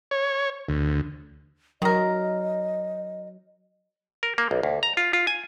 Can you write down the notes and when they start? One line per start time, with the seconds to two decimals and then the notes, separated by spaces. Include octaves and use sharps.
0.11 C#5
0.69 D2
1.82 D#3 F#3 A#4 D#5
4.23 A#4
4.38 A#3
4.51 B1
4.63 D2
4.83 A#5
4.97 F4
5.13 F4
5.27 G#5